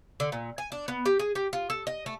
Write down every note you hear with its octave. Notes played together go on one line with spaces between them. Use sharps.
D3
A#2
G#5
D4
B3
G4
G#4
G4
F4
A4
D#5
A3